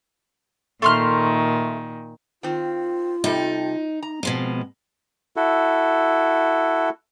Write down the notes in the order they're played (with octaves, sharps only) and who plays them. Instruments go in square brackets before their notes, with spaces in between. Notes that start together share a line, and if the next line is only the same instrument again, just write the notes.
[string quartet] A#2 D#3 [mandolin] A3 C6 F6
[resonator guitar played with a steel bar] D#3 C4 [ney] F4
[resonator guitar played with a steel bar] C3 G3 A4 [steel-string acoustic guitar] D#4
[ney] D#4 [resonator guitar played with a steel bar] A#5
[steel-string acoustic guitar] B2 F3 G#3 [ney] C4
[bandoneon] E4 F#4 A4